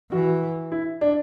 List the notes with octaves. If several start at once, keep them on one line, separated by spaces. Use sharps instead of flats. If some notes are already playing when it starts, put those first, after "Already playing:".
E3 F#4
E4
D4